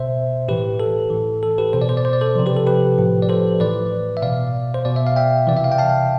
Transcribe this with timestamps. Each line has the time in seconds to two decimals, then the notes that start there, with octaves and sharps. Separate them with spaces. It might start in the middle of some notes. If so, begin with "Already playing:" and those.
Already playing: B2 C5 E5
0.48 A2 E3 G4 B4
0.80 A4
1.10 A2 E3
1.43 A4
1.58 G4 B4
1.73 B2 C5
1.82 D5
1.89 C5
1.97 D5
2.05 C5
2.13 D5
2.21 A4 C5
2.36 C3 F3
2.46 G4 B4
2.56 A4
2.67 G4 B4
2.98 A2 F3
3.22 D5
3.29 A4 C5
3.60 A2 E3 B4 D5
4.17 E5
4.22 B2 D5 F5
4.74 C5
4.85 B2 D5
4.96 E5
5.07 F5
5.16 E5 G5
5.47 E3 D5
5.52 C3 E5
5.64 F5
5.72 G5
5.78 F5 A5